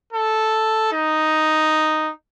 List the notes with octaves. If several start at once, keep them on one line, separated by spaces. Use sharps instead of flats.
A4
D#4